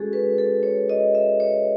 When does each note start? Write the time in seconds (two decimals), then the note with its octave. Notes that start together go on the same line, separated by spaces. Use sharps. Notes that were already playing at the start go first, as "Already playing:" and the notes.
Already playing: G#3 C#4 F#4 G#4 A4
0.13 B4
0.38 A4
0.63 C#5
0.89 D#5
1.15 E5
1.40 C#5